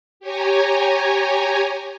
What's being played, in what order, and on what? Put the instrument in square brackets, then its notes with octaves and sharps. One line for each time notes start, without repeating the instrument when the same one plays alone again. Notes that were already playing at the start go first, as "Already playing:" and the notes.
[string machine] G4 C#5 G#5 A#5